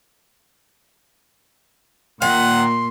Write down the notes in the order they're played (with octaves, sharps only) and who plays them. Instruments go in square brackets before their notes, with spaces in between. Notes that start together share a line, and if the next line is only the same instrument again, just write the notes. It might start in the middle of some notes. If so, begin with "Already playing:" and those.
[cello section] A#2 [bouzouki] D#3 [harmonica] F#5 [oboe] C6